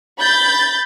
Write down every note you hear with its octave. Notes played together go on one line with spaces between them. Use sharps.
B5 G6 A6